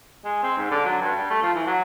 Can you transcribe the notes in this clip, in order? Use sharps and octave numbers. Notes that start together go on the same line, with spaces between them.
G#3
C4
G#2
D3
F#3
G2
G3
A3
F3
E3
F#3